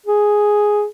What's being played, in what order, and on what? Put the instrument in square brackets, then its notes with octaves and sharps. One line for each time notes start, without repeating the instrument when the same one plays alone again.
[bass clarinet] G#4